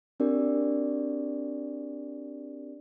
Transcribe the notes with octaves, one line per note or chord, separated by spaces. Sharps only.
C4 D4 F#4 G4 A#4 D5